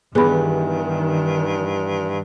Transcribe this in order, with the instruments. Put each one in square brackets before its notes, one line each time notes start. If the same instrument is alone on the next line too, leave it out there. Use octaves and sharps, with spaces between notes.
[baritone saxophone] G2 [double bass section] D#3 [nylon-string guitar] E3 B3 G4 [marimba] G#4 B5